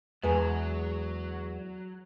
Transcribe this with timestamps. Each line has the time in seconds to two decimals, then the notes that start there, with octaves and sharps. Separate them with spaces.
0.24 E2 F#3 G#3 B4 G#5 A#5